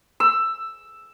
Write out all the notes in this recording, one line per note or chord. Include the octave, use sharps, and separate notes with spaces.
E6